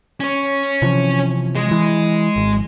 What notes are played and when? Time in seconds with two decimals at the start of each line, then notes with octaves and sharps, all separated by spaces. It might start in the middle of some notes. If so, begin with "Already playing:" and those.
0.20 C#4 C#5
0.82 C3 E3 F3
1.55 G#3
1.71 E3
2.36 G#1